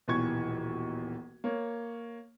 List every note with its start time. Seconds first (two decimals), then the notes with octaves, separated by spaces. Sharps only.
0.08 D#1 B1 E3 C#6 G#6
1.44 A#3 C#5